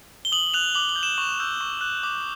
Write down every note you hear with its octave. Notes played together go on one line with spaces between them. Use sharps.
G7
D#6 F#7
F#6 F7
D6 F#7
F#7
G6
E7
C#6 F7
E6 G6
C#6
F#6
D6